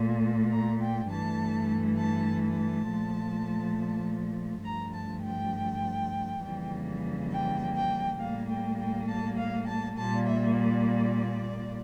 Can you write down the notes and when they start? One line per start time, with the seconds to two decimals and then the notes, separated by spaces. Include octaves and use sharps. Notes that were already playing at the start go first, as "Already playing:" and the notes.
Already playing: A#2 A3
0.51 A#5
0.80 G5
1.09 G2 E3 A3 A5
1.97 A5
2.42 A5
2.86 A#2 F3 A3
4.64 G2 F3 A3 A#5
4.93 A5
5.24 G5
6.42 F2 C#3 E3 G3 A#3
7.31 G5
7.75 G5
8.19 A2 G3 A#3 F5
8.49 G5
8.78 G5
9.07 A5
9.37 F5
9.66 A5
9.97 A#2 G3 A#3 A5
10.26 E5
10.56 D5